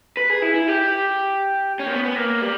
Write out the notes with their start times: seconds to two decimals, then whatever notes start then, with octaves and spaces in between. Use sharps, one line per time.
0.17 B4
0.30 G#4
0.42 E4
0.54 E4
0.68 G4
1.80 C#4
1.86 A#3
1.92 B3
2.04 B3
2.16 A#3
2.42 G3